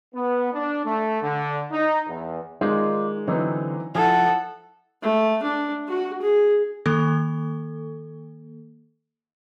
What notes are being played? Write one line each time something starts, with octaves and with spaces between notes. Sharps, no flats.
B3
D4
A3
D3
D#4
E2
D#3 G#3 D#4 F4 D5
D3 E3 F#3 C4 D#4
F3 E4 A4 F#5
A3
D4
F#4
G#4
D#3 A#3 A4